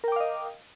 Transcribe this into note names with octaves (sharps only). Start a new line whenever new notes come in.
A#4 D#5 F5 G5 D6